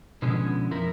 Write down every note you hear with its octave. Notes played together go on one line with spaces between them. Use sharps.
B2 D3 F3 G#3 B3 C#4
F2 F3 E4 A#4